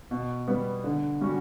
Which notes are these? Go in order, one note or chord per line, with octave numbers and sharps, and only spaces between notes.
B2
G3 B3
D3
G3 C#4 F#4